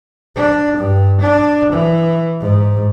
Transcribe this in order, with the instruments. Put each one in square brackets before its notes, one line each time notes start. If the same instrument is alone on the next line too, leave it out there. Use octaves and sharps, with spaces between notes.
[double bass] D4
G2
D4
E3
G#2